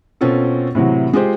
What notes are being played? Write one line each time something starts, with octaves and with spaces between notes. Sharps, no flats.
B2 C4 C#4 F4 A4
A2 C3 E3 F#3
G#3 F4 G4 C5